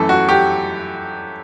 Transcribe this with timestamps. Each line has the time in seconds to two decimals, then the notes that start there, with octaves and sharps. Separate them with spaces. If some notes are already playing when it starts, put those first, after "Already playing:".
Already playing: F#2 E3 A3 A4
0.09 F#4
0.29 G4